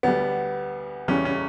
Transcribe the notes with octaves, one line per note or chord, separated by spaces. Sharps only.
D2 D3 G3 B3
E2 C#3 E3 G3 C#4
C#4